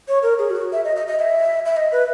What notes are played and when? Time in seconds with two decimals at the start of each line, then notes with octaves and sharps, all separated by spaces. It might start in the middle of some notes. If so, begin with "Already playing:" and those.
0.08 C#5
0.23 A#4
0.39 G#4
0.50 F#4
0.73 E5
0.84 D#5
0.96 D#5
1.07 D#5
1.19 E5
1.65 E5
1.77 D#5
1.92 B4